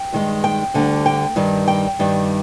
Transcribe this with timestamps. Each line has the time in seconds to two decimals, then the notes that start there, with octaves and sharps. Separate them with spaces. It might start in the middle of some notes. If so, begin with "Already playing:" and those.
Already playing: G5
0.13 G2 D#3 G#3
0.44 G5
0.74 D2 D3 G3
1.06 G5
1.36 G2 D#3 G3
1.68 G5
1.99 G2 D#3 G3